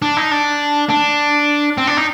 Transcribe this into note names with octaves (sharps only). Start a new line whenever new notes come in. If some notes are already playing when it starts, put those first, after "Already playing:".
D4
D#4
D4
D4
C4
D4
D#4